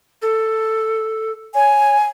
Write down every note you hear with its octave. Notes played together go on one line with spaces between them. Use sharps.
A4
C#5 G#5